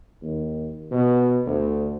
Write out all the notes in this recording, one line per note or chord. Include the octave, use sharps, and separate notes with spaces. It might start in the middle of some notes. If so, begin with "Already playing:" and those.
D#2
B2
D2